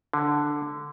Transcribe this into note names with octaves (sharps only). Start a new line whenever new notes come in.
D3